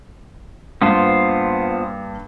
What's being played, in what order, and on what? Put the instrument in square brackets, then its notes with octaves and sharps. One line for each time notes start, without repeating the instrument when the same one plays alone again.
[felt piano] G2 A#3 [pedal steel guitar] B3 F4 C5